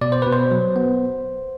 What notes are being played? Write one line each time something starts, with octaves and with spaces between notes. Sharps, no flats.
B2 D5
C5
B2 B4
C5
F#3
B3